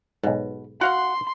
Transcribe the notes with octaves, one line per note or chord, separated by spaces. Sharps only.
B1 G#2 B2
F#4 F5 F#5 C6